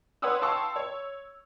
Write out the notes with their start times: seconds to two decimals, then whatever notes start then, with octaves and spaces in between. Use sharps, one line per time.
0.22 B4 C#5 F#5 C6 D#6 E6
0.42 F5 G5 A5 C6 C#6 E6
0.76 C#5